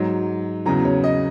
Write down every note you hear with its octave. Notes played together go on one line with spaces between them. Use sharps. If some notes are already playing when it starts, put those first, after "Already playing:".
Already playing: G#2 F#3
E2 C#3 F#3 A#5
C#5
D#5